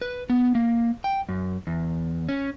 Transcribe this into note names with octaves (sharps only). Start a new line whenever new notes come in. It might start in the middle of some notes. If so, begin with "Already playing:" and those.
B4
B3
A#3
G5
F#2
E2
C#4